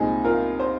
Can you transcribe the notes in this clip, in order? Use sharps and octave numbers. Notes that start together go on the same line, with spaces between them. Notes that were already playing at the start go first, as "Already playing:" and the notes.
Already playing: C2 A#2 G#3 C4 D#4 G#4
F4 A#4
C5